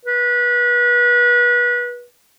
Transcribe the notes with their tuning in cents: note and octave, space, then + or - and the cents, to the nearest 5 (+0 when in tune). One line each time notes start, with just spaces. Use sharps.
B4 -30